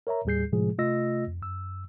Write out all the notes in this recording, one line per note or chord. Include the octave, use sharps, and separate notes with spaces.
A#4 C#5 E5 A#5
D#2 A2 G3 G#4 G6 C7
A2 C3 F3 G#3 G#4
C3 A3 F4 D#5 E6 A#6
F2
F#2 E6